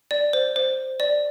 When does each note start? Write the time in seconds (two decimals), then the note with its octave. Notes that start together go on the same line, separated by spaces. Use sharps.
0.11 D5
0.33 C5
0.56 C5
1.00 D5